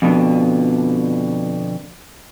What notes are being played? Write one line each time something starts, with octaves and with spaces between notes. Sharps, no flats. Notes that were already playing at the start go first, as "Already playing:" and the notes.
F2 B2 D3